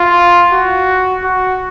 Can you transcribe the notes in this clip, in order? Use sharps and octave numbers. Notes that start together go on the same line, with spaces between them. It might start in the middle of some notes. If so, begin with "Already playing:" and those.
Already playing: F4
F#4
F#4